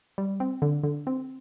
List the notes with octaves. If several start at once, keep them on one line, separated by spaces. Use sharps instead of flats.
G3
C4
D3
D3
C4